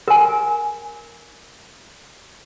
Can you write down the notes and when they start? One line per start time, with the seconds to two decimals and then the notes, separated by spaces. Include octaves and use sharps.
0.08 A#4 G#5